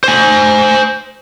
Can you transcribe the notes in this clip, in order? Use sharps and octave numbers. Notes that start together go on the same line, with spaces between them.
C5 G#5